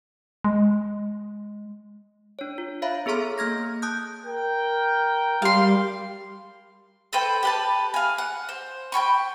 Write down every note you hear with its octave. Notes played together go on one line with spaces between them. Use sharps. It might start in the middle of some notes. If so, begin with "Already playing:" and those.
G#3
D4 C#5
F4
C#5 E5 F5 A#5 B5
B3 G#4 A4 A#5 C6 F6
A#3 F6 G#6 A#6
A5 D#6 F#6 G6
A#4 G5
G3 F5 C6
A4 B4 C5 G5
G4 B4 A5
F5 G#5
F#5
C5
G5 G#5 B5 C#6